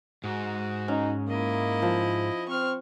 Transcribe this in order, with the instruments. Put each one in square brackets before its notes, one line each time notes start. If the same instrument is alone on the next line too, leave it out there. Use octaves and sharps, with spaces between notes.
[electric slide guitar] G#2 [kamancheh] F#4
[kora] C#4 [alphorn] D#4
[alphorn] A#3 [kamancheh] E4 D#5
[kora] F3
[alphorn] C4 [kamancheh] C#6 F6